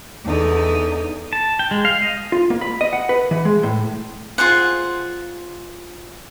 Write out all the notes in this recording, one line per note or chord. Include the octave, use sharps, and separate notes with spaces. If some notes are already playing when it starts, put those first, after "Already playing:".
E2 D3 D#4
A5
G5
G#3
F5
D#5
F4
A#3
B5
D#5
F#5
B4
E3
G#3
A2
F4 G#4 C5 F#5